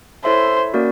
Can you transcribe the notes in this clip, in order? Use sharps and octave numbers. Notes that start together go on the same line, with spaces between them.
E4 A4 C5 C#5 E5
A#3 C#4 F#4 A#4 D5